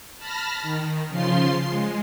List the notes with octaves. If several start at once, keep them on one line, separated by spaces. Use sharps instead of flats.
A5 B5 F6 A#6
D#3
C#3 F3 F4 C6 C7
G#3